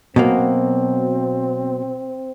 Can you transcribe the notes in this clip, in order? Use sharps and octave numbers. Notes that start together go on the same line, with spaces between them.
B2 F#3 A#3 C4